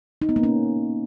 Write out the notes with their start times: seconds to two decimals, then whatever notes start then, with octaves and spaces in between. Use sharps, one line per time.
0.22 D#4
0.29 B3
0.36 A#3
0.43 C#4